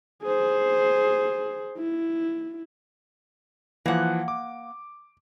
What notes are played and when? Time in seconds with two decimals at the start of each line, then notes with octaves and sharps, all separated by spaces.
0.23 G#4 C5
1.78 E4
3.86 E3 F3 A#3 F#5
4.28 D6